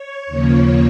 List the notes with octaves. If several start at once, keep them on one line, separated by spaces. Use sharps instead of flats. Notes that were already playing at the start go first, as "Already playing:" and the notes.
Already playing: C#5
D#2 C#3 F3 A#3